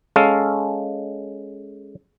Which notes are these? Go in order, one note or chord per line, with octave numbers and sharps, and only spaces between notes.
G#3 C#4 A4 F5